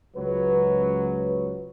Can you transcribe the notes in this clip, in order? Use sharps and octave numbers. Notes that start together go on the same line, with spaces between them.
C#2 F#3 B4